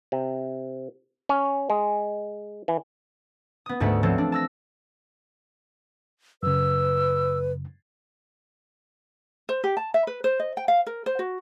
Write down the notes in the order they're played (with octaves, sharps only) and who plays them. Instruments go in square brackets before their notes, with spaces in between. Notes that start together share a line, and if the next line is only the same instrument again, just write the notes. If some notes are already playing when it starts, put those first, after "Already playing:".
[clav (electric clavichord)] C3
C#4
G#3
E3
[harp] B3 D#6
D2 G#2 A3 A4 E5 F#5
F3 C4 A4 C#5
D4
A5 E6 A#6
[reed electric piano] F#2 C#3 [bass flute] B4 [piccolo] E6
[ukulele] C5
G4
A5
E5
B4
C5
D#5
G5
F5
A#4
C5
F#4